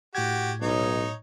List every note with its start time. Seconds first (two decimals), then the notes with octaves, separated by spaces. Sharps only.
0.15 A2 F#4 G4 G#6
0.62 B1 D#4 C#5